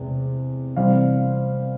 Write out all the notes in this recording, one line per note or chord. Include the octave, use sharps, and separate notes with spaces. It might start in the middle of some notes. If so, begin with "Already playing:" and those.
Already playing: E2 C3 G#3
C3 E3 G3 C4 F5